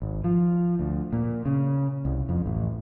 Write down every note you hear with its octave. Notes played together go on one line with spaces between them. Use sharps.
G#1
F3
D2
A#2
C#3
C2
F2
A1